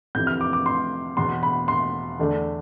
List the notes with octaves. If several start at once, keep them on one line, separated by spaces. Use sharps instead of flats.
F2 C3 E3 G6
F6
D6
D6
C6
E1 E2 B2 C6
B5
C6
E2 D3 A3 D4